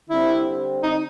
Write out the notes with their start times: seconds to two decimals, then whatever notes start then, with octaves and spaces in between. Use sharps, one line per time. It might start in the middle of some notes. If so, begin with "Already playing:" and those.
0.10 D3 G3 C4 E4
0.83 D#4